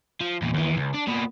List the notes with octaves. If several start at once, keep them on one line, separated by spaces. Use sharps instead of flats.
F3
E2 A#2
D#2 E3
C#2
D4
A#2 B3